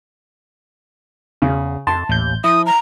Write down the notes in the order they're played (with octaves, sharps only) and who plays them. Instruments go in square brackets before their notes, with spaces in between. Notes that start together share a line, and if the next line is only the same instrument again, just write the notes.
[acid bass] E2 [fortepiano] C#3
[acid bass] F2 [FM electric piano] A5 [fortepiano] C6
[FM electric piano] A1 G6 [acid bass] D#2
[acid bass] F3 [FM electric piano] E4 [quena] D#6
[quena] A#5